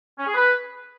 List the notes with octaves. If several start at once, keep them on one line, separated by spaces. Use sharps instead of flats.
C#4
G#4
B4